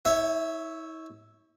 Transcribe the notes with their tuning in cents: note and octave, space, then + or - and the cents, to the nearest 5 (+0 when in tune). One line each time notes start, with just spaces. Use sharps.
E4 -45 C#5 +0 E5 +0